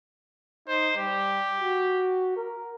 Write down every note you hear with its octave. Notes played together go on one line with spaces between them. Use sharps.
D#4 C5
G3 G4
F#4
A#4